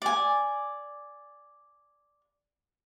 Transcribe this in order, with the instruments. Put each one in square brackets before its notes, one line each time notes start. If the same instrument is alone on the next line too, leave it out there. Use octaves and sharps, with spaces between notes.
[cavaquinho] D5 G#5